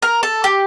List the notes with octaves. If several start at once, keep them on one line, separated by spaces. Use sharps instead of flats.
A#4
A4
G4